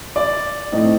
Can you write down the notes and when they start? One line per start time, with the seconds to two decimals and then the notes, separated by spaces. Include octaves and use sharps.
0.16 D5
0.72 A2 A3 C4 D#4